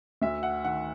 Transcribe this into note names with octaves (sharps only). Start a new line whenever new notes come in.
D2 E5
F#5
D#3 F#5